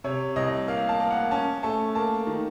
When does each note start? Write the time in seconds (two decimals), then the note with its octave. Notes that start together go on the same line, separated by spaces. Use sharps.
0.04 C3 C#5
0.36 C2 D#5
0.68 A#3 F5
0.89 A5
1.00 A#3
1.11 F#5
1.31 C#4 A5
1.63 A3 A5
1.95 A#3 A5
2.27 D#3